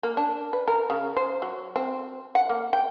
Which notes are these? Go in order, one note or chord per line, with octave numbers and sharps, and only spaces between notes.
A#3
D4
B4
A#4
C#3
C5
F#3
C4
F#5
A#3
G5